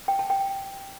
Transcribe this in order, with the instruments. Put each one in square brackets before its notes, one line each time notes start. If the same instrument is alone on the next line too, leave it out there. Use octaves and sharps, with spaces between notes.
[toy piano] G5
A5
G5